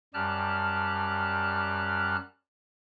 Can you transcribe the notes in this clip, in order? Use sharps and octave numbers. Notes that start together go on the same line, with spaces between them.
F#2 G3 G4 A5 F6 F#6